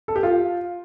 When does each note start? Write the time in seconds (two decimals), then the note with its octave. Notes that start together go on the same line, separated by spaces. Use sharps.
0.08 A4
0.16 G4
0.23 F4